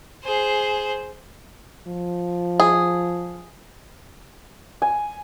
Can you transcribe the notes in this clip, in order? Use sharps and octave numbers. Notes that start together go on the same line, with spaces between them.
G#4 C5
F3
G#4
G#5